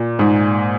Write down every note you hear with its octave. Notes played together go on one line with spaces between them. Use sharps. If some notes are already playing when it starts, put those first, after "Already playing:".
Already playing: A#2
G#2